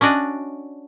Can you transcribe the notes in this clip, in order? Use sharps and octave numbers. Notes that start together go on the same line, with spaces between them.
C#4 D4 F#4 D5 D#5